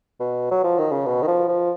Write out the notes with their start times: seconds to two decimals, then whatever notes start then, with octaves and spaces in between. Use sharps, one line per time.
0.20 B2
0.51 F#3
0.64 F3
0.78 D#3
0.92 C#3
1.06 B2
1.23 D#3
1.27 F3
1.49 F3